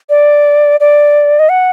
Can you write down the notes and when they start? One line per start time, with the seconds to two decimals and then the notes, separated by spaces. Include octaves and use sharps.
0.10 D5
0.80 D5
1.39 D#5
1.50 F#5